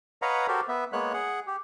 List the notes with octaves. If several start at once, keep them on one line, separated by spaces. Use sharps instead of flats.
B4 C#5 D#5 F5 F#5 A#5
F#4 G4 A4 A#4 C5
B3 E5
G#3 A#3 B3 C#5 F#6
G#4 F#5
G4